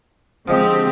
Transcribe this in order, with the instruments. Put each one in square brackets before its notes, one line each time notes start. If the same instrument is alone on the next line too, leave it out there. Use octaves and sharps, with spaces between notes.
[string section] D3 C4 G4 [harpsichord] F3 G#3